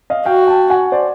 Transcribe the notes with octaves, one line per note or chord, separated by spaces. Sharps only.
D#5 F5
F#4 F5 G5
G5 A5
F#5 G#5
C5 D5